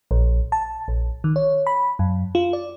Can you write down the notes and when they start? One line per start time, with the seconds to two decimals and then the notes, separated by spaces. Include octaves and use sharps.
0.11 A#1
0.52 A5
0.88 A#1
1.24 D#3
1.36 C#5
1.67 B5
1.99 F#2
2.35 F4
2.53 D5